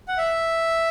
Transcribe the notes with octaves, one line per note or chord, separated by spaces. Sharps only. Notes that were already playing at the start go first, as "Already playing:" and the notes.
F#5
E5